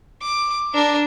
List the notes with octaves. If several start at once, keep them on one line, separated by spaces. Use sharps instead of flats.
D6
D4 A#4